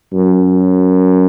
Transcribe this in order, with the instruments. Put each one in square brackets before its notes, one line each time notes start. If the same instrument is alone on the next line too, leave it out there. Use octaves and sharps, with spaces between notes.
[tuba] F#2